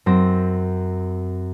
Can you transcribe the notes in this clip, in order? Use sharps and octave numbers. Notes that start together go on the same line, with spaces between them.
F#2 C4 A#6